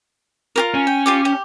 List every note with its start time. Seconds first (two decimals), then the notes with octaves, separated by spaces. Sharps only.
0.56 F4 G4 A#4
0.74 C#4
0.87 G5
1.06 F4 G4 D6
1.25 G4